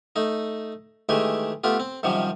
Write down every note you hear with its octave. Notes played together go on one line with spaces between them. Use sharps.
A3 D#4
D#3 E3 G#3 A3 G4
A3 B3 F4 G4
C4
F#2 C3 D#3 F3 G3